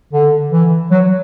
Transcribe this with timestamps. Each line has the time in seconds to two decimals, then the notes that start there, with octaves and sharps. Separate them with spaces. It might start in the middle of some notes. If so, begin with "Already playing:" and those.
0.13 D3
0.52 E3
0.91 F#3